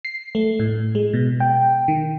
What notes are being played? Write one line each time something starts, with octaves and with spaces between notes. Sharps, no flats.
C7
A3
A2
G#3
B2
G5
D#3